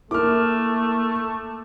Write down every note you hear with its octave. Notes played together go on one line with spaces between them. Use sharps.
A3 A#3 E4 A#4 D6 F6